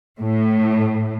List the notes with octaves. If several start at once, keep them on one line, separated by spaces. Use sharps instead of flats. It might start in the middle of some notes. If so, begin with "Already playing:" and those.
A2